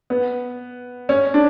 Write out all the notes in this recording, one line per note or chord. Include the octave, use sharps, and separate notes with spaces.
B3
C#4
D4